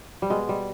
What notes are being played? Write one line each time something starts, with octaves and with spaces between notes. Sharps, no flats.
G3
B2 G#3
G3